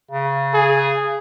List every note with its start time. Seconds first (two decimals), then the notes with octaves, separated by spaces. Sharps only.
0.11 C#3
0.54 G#4